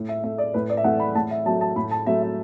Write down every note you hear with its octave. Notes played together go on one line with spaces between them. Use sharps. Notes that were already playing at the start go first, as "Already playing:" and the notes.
Already playing: A2
E5
A3 E5
D5
A2 B4
D5
E5
E3 A3 F#5
B5
A2 A5
E5
F#3 A3 A5
A5
A2 B5
A5
F#3 A3 E5
E5